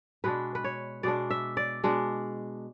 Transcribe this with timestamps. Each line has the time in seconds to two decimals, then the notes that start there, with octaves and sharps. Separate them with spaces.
0.24 B2 G#3 D4 B4
0.55 B4
0.64 C#5
1.03 B2 G#3 D4 D5
1.31 E5
1.57 D5
1.84 B2 G#3 D4